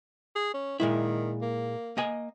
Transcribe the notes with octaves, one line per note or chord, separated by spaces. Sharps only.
G#4
C#4
A#2 D#3 G#3 E4
A#3
A#3 D#5 G#5